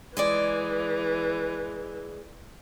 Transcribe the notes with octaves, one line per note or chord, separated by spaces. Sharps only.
E3 G#3 G#4 D5